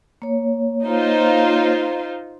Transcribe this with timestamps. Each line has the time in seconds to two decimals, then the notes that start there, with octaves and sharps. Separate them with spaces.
0.22 A#3 C#5
0.84 D#4 F4 C5